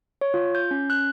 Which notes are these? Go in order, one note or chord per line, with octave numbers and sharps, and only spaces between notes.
C#5
F4
G6
C#4
F#6